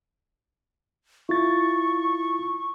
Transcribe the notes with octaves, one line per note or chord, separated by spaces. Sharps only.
E4 F4 C#6 A6